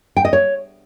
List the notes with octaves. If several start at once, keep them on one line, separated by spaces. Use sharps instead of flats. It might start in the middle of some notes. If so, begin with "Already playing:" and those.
G5
D#5
C#5